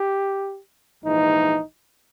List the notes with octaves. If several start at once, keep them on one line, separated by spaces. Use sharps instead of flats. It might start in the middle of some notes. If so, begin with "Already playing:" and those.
Already playing: G4
A#1 G#2 E3 D#4